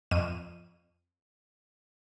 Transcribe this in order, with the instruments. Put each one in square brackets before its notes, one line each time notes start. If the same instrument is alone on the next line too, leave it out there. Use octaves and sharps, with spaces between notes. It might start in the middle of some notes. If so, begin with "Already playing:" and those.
[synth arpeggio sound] F2 D#7